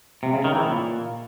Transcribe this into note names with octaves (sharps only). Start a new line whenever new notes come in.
C3
C#3
D#3
E3
A#2